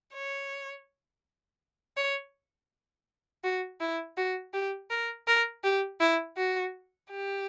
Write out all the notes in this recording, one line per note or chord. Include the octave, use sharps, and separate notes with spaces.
C#5
C#5
F#4
E4
F#4
G4
A#4
A#4
G4
E4
F#4
G4